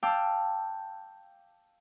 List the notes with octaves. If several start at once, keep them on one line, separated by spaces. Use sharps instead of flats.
F5 G5 A5 D6 E6